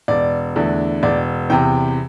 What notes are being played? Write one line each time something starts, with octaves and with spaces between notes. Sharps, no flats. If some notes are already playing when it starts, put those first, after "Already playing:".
E1 D5
E2 D3 A3 D4
E1 D5
E2 C3 G5